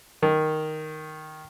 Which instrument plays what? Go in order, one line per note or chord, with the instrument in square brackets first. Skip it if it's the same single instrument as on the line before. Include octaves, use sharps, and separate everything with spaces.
[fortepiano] D#3